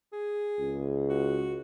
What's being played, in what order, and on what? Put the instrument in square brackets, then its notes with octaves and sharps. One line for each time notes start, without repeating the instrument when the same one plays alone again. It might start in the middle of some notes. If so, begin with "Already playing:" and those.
[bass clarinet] G#4
[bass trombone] C#2
[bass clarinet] F#4